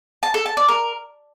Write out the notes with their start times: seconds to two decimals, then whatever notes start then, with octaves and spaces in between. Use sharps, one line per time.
0.23 A5
0.34 A4
0.46 A5
0.57 D5
0.68 A#4